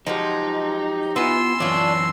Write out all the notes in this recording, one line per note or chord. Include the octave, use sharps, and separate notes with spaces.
F3 F#3 G#3 D#4 G4
B3 E4 F4 G#5 C6 E6
F#2 E3 D4 F4 C#5